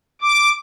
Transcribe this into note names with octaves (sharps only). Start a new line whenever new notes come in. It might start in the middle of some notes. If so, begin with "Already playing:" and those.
D6